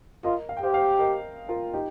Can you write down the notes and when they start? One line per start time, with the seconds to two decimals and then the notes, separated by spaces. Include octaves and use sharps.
0.24 F4 A#4 D#5
0.49 F5
0.57 G5
0.61 G4 C5 F5
0.74 C5 F5
0.99 A#4 D#5
1.49 F4 A#4
1.73 D#4 G4